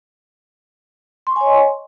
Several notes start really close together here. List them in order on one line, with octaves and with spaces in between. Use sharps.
C6 C#6 G#5 C#5 D#5